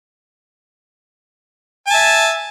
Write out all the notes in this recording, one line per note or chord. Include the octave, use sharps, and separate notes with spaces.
E5 G#5 A5